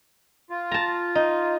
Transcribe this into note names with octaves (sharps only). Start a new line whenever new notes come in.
F4
A5 A#5
D#4